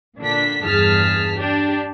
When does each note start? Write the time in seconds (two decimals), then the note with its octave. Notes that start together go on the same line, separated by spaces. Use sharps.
0.19 A#2 D3 D4 B6
0.66 E2 G2 G#4 A5 F6 B6
1.37 D4 G4